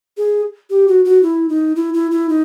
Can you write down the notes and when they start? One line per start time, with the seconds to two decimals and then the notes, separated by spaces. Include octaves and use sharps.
0.17 G#4
0.70 G4
0.88 F#4
1.05 F#4
1.23 E4
1.49 D#4
1.76 E4
1.94 E4
2.11 E4
2.29 D#4